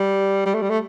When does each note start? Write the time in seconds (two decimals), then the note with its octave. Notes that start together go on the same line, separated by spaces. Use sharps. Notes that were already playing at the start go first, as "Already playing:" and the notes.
Already playing: G3
0.46 G3
0.54 A3
0.62 G3
0.70 A3